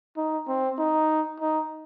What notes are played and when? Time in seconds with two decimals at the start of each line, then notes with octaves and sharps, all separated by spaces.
0.17 D#4
0.48 C4
0.78 D#4
1.40 D#4